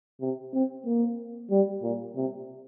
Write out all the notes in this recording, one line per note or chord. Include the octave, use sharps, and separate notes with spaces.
C3
C4
A#3
G3
A#2
C3